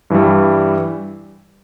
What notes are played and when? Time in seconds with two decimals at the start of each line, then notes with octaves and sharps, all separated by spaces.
0.10 G2 E3 G3